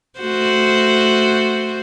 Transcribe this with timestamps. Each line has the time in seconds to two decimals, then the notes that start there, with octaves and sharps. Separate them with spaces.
0.20 A3 F#4 C5